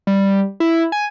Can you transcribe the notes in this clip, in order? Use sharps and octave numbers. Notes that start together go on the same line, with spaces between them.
G3
E4
G#5